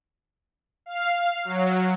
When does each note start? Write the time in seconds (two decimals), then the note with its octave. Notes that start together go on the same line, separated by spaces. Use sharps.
0.86 F5
1.45 F#3